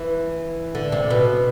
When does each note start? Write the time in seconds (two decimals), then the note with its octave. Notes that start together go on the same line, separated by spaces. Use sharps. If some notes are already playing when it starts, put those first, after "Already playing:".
Already playing: E3
0.75 D3
0.92 C3
1.10 B2